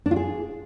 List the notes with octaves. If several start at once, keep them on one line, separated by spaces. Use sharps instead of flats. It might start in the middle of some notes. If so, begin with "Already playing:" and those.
D4
F4
G#4